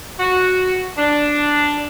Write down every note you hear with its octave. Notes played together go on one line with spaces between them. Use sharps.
F#4
D4